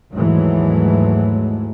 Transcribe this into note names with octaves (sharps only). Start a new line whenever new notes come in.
D#2 G#2 E3 F#3 G#3 A3